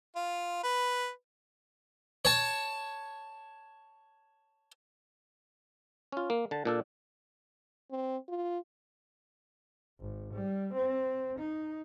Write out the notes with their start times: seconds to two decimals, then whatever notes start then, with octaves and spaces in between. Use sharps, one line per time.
0.16 F4
0.63 B4
2.25 C#5 A5
6.12 C#4 F4
6.30 A#3
6.51 D3 A5
6.65 A#2 D4 A4
7.91 C4
8.29 F4
10.00 G#1
10.33 G3
10.74 C4
11.39 D#4